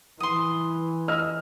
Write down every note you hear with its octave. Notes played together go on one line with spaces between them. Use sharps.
E3 C6 D#6
D#5 E6 F6